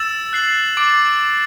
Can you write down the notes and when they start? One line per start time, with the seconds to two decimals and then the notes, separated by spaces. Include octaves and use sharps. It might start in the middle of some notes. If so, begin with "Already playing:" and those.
Already playing: E6 A6 E7
0.33 F#6 C7 F#7
0.77 D6 A6 D7